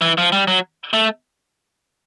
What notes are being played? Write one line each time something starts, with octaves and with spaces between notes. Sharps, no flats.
E3
F3
G3
F#3
A3